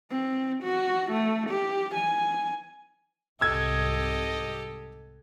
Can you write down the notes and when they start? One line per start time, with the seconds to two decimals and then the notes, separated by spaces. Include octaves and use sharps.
0.10 C4
0.63 F#4
1.12 A3
1.50 G4
1.95 G#5
3.41 C2 G#2 G4 A4 D#5 E6 G#6